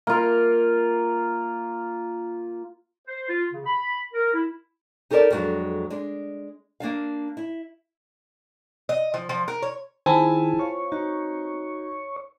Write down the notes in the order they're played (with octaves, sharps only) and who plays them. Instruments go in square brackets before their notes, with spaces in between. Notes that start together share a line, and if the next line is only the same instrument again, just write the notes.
[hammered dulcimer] A#3 F4
[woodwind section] C5
F4
C#3
B5
A#4
E4
[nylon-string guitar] D#4 G4 A4 A#4 C5 D5
F2 F#3 G#3 B3 D4
G#3 D4
A#3 D4 F5
E4
[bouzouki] D#5
F3
F3
A#4
C#5
[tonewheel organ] D#3 [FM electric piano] C4 [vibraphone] E4 F4 G#4 [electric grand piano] G#5 A5 B5
[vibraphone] F4 F5 [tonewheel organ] C#5
[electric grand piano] D#4 [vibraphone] F#4